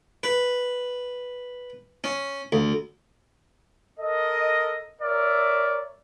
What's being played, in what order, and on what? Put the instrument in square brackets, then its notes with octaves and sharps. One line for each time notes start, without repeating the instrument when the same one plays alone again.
[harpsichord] B4
C#4
D2
[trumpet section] A4 A#4 D#5
A#4 C#5 D5 E5